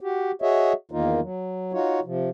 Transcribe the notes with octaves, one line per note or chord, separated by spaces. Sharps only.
F#4 G4
F#4 G#4 C#5 D#5 E5
E2 D#3 A#3 D#4 F4
F#3
D#4 F4 F#4 C#5
C3 F3